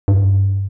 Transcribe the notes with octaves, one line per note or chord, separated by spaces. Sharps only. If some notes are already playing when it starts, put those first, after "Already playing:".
G2